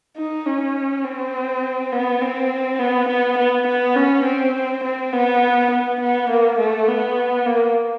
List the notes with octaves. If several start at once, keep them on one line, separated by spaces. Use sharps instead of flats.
D#4
C#4
C4
B3
C4
B3
B3
B3
B3
C#4
C4
C4
B3
B3
B3
A#3
A3
B3
A#3